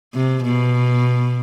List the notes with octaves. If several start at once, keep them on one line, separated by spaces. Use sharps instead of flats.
C3
B2